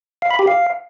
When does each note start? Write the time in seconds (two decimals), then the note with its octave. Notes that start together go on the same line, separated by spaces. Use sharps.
0.22 F5
0.31 B5
0.39 G4
0.47 F5